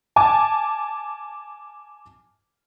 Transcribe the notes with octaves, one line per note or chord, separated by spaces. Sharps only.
G#5 A5 D6